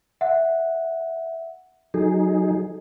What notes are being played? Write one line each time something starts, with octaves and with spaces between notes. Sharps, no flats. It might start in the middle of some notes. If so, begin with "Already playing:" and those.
E5 F#5
F#3 D#4 G#4 A4